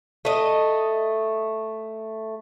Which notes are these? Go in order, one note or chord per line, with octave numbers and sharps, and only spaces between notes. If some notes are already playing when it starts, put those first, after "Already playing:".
A3 D#5